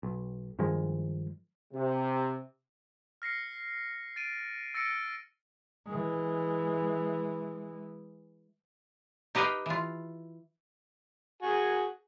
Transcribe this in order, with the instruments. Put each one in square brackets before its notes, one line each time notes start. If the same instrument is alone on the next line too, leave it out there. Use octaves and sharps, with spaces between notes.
[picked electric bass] B1
G2 D#3 F3 G#3
[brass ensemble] C3
[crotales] F6 A#6 C7 C#7
A6 D7 D#7
E6 A6 A#6 C#7 D7
[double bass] E3 G#3
[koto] D#4 G4 B4 D#5 F5 G5
E3 F4
[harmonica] F#4 G#4 G#5